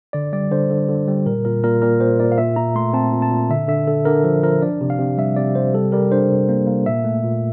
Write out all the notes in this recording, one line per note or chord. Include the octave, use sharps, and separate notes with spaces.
D3 D5
G3 D5
D3 C5
D3
D3
G3
A#2 A#4
A#2 A#4
A#2 A#4
A#2 A#4
A#2 C5
A#2 D5
F5
A#2 E5
A#2 A#5
A3 C6
C4 A5
A#2
A5
A#2
D3 E5
D3 E5
D3 A4
D3 A#4
F3
F3 A#4
D4 D5
C3
F5
C3
G3 E5
C3 D5
C3 C5
G3 A4
G3 A#4
D4 C5
C3
A#3
A#3
A#2 E5
A3
A#2